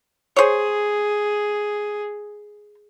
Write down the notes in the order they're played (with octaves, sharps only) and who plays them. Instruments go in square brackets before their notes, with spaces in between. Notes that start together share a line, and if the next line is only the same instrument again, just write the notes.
[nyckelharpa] G#4 [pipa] C5 C#5